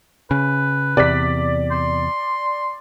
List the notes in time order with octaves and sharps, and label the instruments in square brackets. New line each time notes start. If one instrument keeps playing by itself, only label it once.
[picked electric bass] C#3 [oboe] B4
[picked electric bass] E2 C3 [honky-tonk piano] D5 B6
[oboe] C6